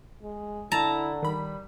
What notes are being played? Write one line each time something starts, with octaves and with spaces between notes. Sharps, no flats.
G#3
D3 E4 A5 A#5
D#3 G3 B5